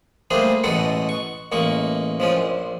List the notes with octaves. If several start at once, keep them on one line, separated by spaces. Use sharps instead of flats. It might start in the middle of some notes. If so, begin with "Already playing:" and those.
G3 A3 A#3 D4 G#4 C5
A1 B2 G#3 F#4 A4 F#5
C#6
A1 G#3 A#3 C#6
F3 G#3 C#4
A#1